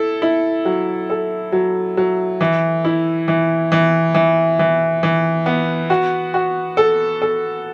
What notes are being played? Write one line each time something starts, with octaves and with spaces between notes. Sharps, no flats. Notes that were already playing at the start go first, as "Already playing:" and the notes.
Already playing: E4 A4
E4
F#3
A4
F#3
F#3
E3
E4
E3
E3
E3
E3
E3
B3
F#4
F#4
A4
A4